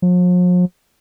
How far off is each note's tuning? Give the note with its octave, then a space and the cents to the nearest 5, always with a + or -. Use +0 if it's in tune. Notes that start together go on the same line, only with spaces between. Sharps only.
F3 +45